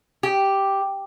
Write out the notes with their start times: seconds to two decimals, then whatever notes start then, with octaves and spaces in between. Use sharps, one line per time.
0.23 G4